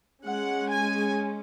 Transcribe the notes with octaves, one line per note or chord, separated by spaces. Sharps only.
G#3 C#4 F#5
G#5